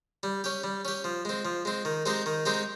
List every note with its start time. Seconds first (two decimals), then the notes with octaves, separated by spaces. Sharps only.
0.23 G3
0.44 C#4 G4
0.64 G3
0.85 C#4 G4
1.04 F3
1.25 G#3 C4
1.45 F3
1.65 G#3 C4
1.85 D#3
2.06 G#3 C4 D#4 G4
2.26 D#3
2.45 G#3 C4 D#4 G4